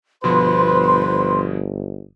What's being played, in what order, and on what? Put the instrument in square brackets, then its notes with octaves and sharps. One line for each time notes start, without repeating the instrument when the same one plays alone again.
[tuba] G1 [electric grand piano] B2 F3 [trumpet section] B4 [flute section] C5 C6